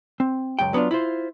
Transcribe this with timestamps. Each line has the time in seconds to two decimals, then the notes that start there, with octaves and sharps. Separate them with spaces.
0.20 C4
0.59 C#2 F#2 G5
0.73 F#3 B3 C#4 D4 F4
0.91 E4 F4 C5